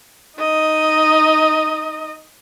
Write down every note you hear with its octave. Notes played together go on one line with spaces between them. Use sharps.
D#4 D#5